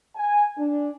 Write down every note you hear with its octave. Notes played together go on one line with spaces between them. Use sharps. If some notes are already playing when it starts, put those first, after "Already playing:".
G#5
D4